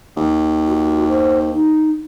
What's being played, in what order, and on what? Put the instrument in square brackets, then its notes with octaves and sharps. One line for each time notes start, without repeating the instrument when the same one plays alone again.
[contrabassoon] D#2
[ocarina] F#4
C5
D#4